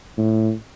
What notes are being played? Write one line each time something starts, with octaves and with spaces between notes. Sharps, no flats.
A2